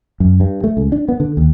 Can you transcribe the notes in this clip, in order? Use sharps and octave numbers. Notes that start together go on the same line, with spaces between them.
F#2
G2
A3
C#2
D4
B3
D3
D#2